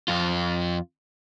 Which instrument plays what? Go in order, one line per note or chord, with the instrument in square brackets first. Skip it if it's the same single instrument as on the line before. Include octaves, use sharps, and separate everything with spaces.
[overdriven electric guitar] F2 F4